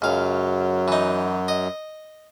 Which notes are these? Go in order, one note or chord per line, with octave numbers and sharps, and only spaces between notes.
C#2 F#2 F#3 F5
E3 D#4
D#5